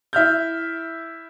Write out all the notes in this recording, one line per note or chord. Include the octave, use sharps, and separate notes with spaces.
E4 E5 F6 G6